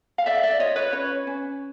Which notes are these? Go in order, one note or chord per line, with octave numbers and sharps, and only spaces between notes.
F5
A4 D5 E5
D5 E5
F4 C#5 D#5
B4 C#5
C#4 B4 C#5
C#4